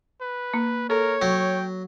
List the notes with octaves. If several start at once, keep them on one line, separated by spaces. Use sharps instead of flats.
B4
A#3
A4 A#4 C#5
F#3 G5